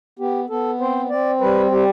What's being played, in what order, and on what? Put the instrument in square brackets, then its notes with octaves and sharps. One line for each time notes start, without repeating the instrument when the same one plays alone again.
[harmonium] B3 G4
B3 A4
C4 C5
C4 D5
G3 B4
G3 G4